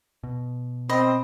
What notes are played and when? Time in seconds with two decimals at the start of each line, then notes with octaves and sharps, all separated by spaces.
0.23 B2
0.89 C4 D#5 B5